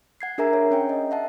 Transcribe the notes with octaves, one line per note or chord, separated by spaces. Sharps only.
F#5 G#6 C7
D4 G#4 A#4 E5 G#5 A#5
C#5
C#4 C#5 G5
D#5
E5 F#5 A5